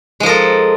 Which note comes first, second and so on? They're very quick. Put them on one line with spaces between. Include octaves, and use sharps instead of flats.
G#3 F3 A#4 A4